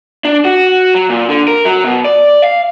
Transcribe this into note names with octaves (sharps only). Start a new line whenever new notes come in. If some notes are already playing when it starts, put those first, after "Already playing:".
D4
F#4
F#3
A#2
D3
A#4
F#3
B2
D5
F5